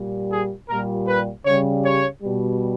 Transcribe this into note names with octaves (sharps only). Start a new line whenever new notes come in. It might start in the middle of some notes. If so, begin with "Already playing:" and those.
Already playing: A#2 G3
G#4
A#2 G3 A#4
B4
C#3 G3 C#5
C#5
B2 G3